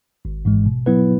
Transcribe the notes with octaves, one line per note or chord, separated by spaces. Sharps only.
G#1
G#2 E3 G#3
B2
F#3 B3 E4 B4